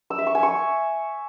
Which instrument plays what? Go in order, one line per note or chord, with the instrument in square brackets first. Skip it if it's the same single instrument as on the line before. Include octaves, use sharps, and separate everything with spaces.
[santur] E6
E5
C#6
G#5
C#6